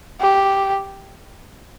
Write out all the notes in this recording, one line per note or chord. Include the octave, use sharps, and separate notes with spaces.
G4